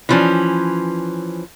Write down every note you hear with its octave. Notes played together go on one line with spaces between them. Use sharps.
E3 F3 C#4